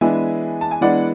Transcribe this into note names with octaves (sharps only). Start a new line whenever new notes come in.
E3 G#3 B3 D4 E5 G#5
A5
G#5
E3 G#3 B3 D4 D5 F#5